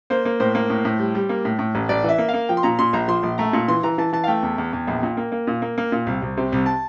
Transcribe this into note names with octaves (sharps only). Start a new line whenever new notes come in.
A#3 C5
A#3
A2 C5
A#3
A2
A2
G3
G3
A#3
A2
A2
A1
A1 D5
E3 E5
A#3
F5
A#3
F3 G5
C6
A#2 A#5
A#2 C6
A#1 A#5
F3 C6
A#1
A3 A#5
A#2
E3 C6
E3 A#5
E3 A5
E3 A5
F5
A3 G5
E2
E2
E2
A#1
A#2
A#3
A#3
A#2
A#3
A#3
A#2
C2
C2
C3
C2
A5